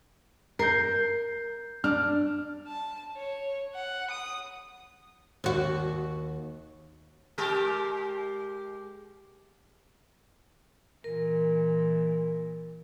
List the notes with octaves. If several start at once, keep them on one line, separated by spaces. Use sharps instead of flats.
A#4 G6 C7
D4 F6
A5
C#5
F#5
D#6
D#2 F#4
G#3 G4 A#4
A#2 E3 A#4